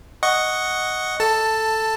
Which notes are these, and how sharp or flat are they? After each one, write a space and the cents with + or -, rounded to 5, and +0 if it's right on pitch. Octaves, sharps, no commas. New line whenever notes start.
D#5 +0 F#5 +0 C#6 +0
A4 +0 A5 +10